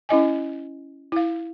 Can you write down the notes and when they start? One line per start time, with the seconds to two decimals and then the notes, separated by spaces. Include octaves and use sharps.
0.09 C#4 E4 D#5 G#5
1.12 E4 F5